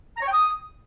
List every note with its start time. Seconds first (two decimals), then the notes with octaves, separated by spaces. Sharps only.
0.17 A#5
0.22 C#5
0.28 G5
0.33 D#6